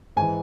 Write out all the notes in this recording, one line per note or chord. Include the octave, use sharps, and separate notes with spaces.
G#2 E3 G#5